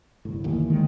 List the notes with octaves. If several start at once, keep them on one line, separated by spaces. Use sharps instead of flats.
G1 C2 A2
A1 D#2
D3 D#3 G#3